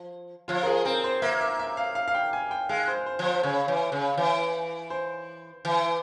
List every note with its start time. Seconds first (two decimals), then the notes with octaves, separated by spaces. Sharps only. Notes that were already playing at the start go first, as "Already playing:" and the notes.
Already playing: F3
0.48 F3 F4
0.63 A#4
0.67 G#4
0.85 C4 A#4
1.04 C5
1.22 A#3 E5
1.41 E5
1.59 E5
1.77 F5
1.95 F5
2.08 F5
2.15 G5
2.33 G#5
2.51 G5
2.69 G#3 F5
2.88 C5
3.06 C5
3.19 F3
3.25 C5
3.43 C#3 C#5
3.68 E3
3.92 C#3
4.17 E3
4.90 C5
5.65 E3